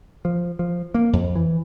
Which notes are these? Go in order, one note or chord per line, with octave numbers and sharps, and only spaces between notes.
F3
F3
A#3
F2
E3